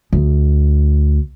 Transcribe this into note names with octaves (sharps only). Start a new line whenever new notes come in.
D2